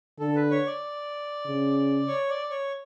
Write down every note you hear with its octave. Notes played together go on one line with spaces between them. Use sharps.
D3 A4
B4
C#5
D5
C#3
C#5
D5
C#5